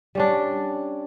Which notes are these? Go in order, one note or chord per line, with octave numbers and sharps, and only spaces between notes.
G3 C#4 D4